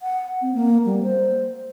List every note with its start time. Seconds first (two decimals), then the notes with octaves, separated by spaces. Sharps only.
0.02 F#5
0.42 C4
0.54 A#3
0.86 G3
1.03 C5